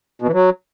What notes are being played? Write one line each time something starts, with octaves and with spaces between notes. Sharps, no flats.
B2
E3
F#3